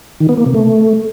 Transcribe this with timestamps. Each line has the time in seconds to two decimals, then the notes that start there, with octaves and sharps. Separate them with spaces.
0.20 D#3
0.29 B3
0.37 A#3
0.46 C3
0.54 A3